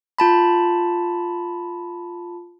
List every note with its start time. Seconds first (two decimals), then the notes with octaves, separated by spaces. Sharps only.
0.18 F4 A5 B5